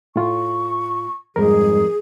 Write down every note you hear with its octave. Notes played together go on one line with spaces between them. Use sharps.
A2 F4 C#6
F2 G#2 G3 G#4 A#4